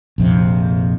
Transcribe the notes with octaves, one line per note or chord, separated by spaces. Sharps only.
A#1 F2 C3